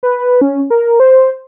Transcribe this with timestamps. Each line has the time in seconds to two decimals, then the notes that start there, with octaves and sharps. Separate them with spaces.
0.03 B4
0.41 C#4
0.70 A#4
1.00 C5